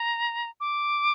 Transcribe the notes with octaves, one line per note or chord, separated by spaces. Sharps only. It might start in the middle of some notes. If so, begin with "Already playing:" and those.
Already playing: A#5
D6